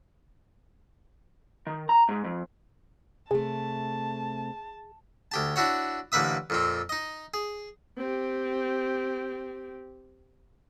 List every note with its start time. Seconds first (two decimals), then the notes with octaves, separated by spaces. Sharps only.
1.67 D#3
1.89 A#5
2.09 G#2
2.25 F2
3.31 C3 A3 G#4 A5
5.32 D2 G4 A5
5.56 D4 E4 F#4 C#5
6.12 A1 D3 A#3 B4 E5 D#6
6.50 F2 A#2 C4
6.89 D#4 D#5
7.34 G#4
7.98 C4 G4